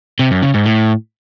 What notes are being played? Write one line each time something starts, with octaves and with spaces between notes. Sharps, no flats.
C3
F#2
C#3
G#2
A2